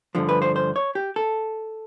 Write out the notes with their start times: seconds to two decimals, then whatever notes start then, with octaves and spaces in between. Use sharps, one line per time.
0.15 G2 D3 F3
0.29 B4
0.42 C5
0.56 C5
0.76 C#5
0.95 G4
1.16 A4